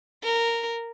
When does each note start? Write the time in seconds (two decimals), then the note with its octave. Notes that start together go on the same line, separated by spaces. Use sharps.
0.23 A#4